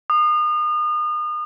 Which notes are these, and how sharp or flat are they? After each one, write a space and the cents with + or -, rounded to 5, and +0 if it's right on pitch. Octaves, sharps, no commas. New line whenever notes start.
D#6 -35